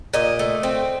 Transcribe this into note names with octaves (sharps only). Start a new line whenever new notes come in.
A#2 D#5
A3
C4